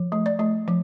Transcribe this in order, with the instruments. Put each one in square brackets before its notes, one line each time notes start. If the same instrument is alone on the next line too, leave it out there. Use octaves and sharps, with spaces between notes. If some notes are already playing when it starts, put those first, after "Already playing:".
Already playing: [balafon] F3
A3
D5
A3
F3